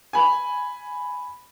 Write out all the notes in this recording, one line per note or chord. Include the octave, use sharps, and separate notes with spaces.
G#5 B5